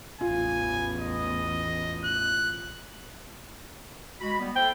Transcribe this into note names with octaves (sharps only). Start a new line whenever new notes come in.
A1 E2 F4 G#5
D#5
F#6
G#3 F#4 B5
G3 B3
E4 A4 C5 G5